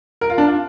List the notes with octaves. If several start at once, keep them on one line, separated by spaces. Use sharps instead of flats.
A#4
F4
D4
F4